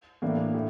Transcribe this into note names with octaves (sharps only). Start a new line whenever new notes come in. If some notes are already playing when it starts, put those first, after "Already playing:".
A2 E3 A#3 D4
A2